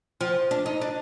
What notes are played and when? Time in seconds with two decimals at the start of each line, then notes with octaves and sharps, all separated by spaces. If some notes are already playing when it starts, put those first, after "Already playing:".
0.21 F3
0.51 D4
0.66 D#4
0.81 D4